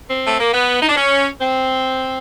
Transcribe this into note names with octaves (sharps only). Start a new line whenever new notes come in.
C4
A3
A#3
B3
D#4
D4
C#4
C4